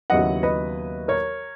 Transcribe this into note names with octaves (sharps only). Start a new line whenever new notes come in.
D#2 C#3 F#3 B3 E4 D#5 F#5
B4 D#5
A#4 C#5